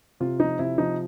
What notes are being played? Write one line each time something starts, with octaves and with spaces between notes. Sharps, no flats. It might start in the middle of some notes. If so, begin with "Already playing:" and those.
C3 F4
F3 D#4
C3 E4
F3 D#4